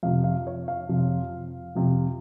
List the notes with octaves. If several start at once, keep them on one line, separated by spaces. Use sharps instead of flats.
F2 C3 F3 F5
F5
C#5
F5
F2 C3 F3
F2 C3 F3